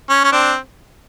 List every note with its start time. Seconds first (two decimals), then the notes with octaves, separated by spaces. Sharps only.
0.10 C#4
0.24 C#4
0.32 C4 D4